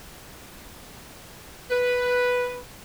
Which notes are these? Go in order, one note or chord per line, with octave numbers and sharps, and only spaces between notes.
B4